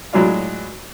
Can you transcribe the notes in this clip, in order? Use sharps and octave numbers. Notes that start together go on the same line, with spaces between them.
A2 F#3 G#3 D4 F4